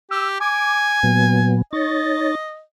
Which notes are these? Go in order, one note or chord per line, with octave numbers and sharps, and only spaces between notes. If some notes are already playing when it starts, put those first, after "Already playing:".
G4 E6
G#5 D6
A#2 F#3 B3
D#4 C#5 D#5 A6